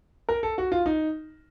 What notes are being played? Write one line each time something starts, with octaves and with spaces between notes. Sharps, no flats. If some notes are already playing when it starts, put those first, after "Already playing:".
A#4
A4
F#4
F4
D#4